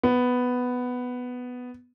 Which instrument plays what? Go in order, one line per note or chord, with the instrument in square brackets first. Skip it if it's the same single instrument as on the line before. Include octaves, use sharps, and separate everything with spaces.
[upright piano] B3